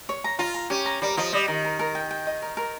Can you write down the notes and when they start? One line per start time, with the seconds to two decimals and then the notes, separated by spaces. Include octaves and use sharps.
0.09 C#5
0.24 A#5
0.39 F4 A#5
0.54 A#5
0.70 C#4 G4
0.86 A#5
1.02 G3 A#4
1.17 F3 D#5
1.33 G3 D#5
1.48 D#3 A#4
1.65 A#4
1.79 A#4
1.95 G5
2.11 G5
2.27 D#5
2.42 A#4
2.57 A#4